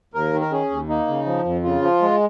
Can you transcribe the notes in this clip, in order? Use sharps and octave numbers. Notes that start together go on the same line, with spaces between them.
D#2 A#4
D#3
A#4
C#4 G#4
D#2
A#3 D#4
C#3
F3
F2
C#3 F4
F3
G#3